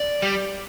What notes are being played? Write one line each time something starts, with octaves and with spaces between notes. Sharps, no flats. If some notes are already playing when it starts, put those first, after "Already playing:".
Already playing: D5
G3